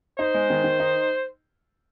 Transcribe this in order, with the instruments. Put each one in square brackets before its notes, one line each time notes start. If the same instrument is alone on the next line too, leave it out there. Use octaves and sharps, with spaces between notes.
[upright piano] D#4 [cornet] C5
[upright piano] G#3
D#3
D#3
D#4